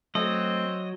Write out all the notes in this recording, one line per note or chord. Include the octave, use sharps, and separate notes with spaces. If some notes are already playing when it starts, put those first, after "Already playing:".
F#3 A3 C4 D#5